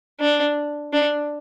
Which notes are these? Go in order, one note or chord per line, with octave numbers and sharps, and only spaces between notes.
D4
D4